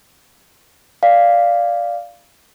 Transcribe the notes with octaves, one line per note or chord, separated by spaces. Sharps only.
D5 F5